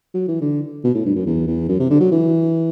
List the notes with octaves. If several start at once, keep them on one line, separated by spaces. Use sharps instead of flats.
F#3
E3
D3
B2
A2
G2
F#2
E2
E2
F#2
C3
D3
F#3
E3